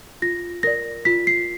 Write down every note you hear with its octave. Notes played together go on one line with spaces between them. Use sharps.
F4 A#6
A#4 D5 A#6
F4 B6
C7